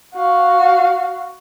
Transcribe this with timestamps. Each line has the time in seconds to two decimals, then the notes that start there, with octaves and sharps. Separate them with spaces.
0.15 F#4 F5